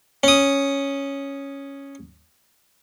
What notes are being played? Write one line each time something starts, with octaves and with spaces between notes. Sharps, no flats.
C#4 D#6